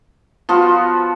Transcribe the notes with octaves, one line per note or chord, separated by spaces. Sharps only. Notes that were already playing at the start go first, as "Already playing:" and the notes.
F3 B3 F4 F#4